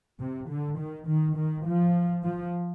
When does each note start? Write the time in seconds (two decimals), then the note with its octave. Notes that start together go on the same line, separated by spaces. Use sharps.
0.20 C3
0.49 D3
0.79 D#3
1.07 D#3
1.37 D#3
1.67 F3
2.24 F3